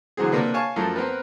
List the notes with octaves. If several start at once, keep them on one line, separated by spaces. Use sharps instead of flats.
A2 D3 E3 F#3 C4 G#4
C3 A#3 D4 B4
C#5 F5 G#5 A5 C#6
F#2 F3 A3
B3 C4 A#4 B4